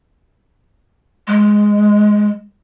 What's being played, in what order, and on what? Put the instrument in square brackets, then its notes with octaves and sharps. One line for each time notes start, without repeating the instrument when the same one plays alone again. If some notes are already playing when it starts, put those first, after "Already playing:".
[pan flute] G#3